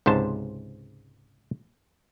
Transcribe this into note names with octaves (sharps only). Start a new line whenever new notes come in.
C#2 G#2 C3 C5 A5